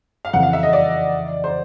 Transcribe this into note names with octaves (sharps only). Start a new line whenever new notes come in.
F5
F2 C#3 E3 F#5
F5
E5
D#5
D5
C5